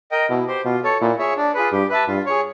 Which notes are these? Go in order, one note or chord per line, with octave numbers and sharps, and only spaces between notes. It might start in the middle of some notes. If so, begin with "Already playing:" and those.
A#4 D#5 G5
B2 E4
G4 C5
B2 F4
A4 C#5
A#2 E4
G#4 C#5 E5
D4
F4 G#4 B4
G2 G4
B4 E5 A5
G2 F4
G#4 C#5